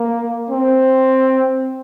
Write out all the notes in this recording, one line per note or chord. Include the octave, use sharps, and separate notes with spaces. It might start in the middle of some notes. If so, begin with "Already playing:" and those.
Already playing: A#3
C4